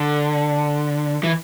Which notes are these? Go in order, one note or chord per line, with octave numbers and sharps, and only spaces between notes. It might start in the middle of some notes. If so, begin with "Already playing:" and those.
Already playing: D3
E3